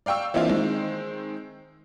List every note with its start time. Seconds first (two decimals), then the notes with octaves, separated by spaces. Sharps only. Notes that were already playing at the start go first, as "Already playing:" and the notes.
0.06 D5 F5 G5 C#6 E6
0.34 E3 A#3 C4 D4 E4 F4
0.48 D#3 G#3 C4